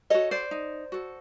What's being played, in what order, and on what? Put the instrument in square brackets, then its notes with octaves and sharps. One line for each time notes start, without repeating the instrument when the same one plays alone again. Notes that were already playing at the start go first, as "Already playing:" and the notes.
[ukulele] F#4 A4 C#5 D#5
C5 D5
D#4
F#4 A4